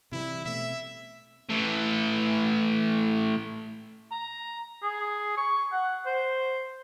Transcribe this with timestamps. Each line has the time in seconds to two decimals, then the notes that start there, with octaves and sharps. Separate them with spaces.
0.12 C3 E3 G3 E4
0.45 B2 A3 C4 E5
1.50 A2 E3
4.12 A#5
4.83 G#4
5.37 C#6
5.72 F#5
6.06 C5